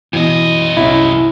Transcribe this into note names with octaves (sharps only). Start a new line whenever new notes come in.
F#2 B2 E3 D#5
C2 C#4 E4